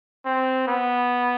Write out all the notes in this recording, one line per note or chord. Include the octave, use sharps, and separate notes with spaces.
C4
B3